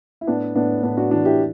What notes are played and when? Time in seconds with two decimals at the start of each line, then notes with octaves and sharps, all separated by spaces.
0.21 E4
0.27 A2 B3 D4
0.55 A2 B3 D4
0.83 A2 B3 D4
0.97 D4 F#4
1.11 E3 D4 F#4
1.25 E4 G4